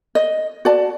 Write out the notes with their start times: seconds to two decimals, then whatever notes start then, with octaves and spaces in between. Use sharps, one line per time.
0.15 D#5
0.65 F#4 D5 A5